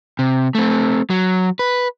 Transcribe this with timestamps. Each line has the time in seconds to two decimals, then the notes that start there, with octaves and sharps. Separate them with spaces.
0.19 C3
0.55 A3 C4
1.10 F#3
1.59 B4